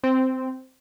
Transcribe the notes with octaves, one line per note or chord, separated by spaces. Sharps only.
C4